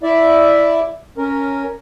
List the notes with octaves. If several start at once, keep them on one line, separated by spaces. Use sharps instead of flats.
E4 D5 E5
C#4 A#4